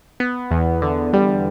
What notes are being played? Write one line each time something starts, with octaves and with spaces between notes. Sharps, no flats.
B3
E2
D3
G3